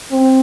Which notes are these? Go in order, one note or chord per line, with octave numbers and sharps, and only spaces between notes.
C4